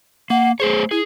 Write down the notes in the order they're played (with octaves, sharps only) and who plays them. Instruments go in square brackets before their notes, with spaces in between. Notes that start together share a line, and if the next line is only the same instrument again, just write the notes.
[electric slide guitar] A#3 [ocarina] F#5
[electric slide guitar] A3 C5 C#5 [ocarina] G#4
[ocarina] E4 [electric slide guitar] G#4